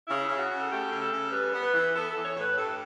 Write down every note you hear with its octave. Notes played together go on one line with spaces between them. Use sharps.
C#3 E4
C#3
F#4
C#3
A4
A3 G4
C#3
A4
C#3
G3 B4
B3
B4
E3
B3 A4
A4
E3
C#5
A2 B4
G2 A4